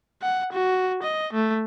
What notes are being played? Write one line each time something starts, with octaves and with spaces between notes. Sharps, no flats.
F#5
F#4
D#5
A3